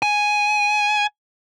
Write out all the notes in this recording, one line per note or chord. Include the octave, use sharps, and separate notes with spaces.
G#5